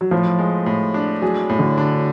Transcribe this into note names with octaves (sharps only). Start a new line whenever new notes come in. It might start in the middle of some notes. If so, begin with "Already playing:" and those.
F#3
A2 F3
G#3
A2
D4
F#3 G#4
A2
D3
D4